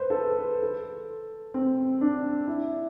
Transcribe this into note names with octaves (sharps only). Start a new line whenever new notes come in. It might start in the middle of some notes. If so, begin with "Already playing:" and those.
Already playing: B4 C5
A4
B4
B4
A4
C4
D4
E4